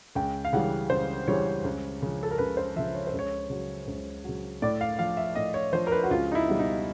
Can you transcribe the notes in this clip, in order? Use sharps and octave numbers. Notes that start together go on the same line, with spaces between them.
C#2 G5
F5
C#3 E3 G3 F#5
C#2 C5
C#3 E3 G3 C#5
C#2
C#3 F3
A4
A#4
C#2 B4
C5
C#3 F3 E5
C#5
C5
C#2
C#5
C#3 F#3
C#2
C#3 F#3
A2 D5
F5
F3 F5
E5
A2 D#5
C#5
F3 C5
A#4
B4
F#4
C#2 F4
D#4
E4
B2 G3
D#4